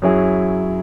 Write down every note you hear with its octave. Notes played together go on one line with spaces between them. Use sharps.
F#2 F#3 E4 G#4